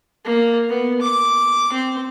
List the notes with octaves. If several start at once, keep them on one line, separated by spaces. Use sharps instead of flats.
A#3
B3
D6
C4